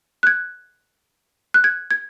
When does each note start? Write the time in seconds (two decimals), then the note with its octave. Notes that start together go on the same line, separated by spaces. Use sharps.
0.23 F#6
0.27 G#6
1.54 F#6
1.64 G#6
1.91 G#6